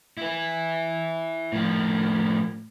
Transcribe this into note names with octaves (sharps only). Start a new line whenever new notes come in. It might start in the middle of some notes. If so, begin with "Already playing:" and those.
E4 B4
A2 F3